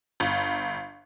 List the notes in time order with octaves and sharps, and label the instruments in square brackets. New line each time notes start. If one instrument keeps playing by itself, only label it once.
[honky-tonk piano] G1